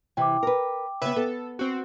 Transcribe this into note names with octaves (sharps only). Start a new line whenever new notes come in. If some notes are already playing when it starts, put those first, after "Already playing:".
C3 E3 G5 D6
A#4 B4
C#3 B3 B4 E5
B3 A4
C4 F#4